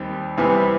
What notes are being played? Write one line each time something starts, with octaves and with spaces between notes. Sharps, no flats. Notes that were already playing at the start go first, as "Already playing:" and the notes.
Already playing: D#2 D#3 G3 C4
E2 C3 E3 G3 B3